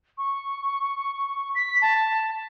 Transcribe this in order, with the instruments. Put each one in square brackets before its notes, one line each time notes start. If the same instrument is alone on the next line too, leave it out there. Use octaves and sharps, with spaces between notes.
[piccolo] C#6
B6
A5